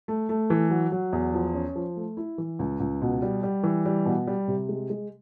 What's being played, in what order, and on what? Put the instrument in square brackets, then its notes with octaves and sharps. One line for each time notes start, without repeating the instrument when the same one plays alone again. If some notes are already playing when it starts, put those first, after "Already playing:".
[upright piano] A3
A3
E3
F#3
F#3
E2
F3
C#4
F3
A3
E4
E3
C#2
C#2
B2
G3
G3
E3
G3
B2
G3
C3
G#3
G#3